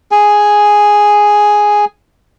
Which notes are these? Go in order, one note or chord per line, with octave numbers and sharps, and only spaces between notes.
G#4 G#5